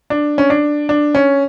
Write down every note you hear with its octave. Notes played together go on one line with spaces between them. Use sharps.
D4
C#4
D4
D4
C#4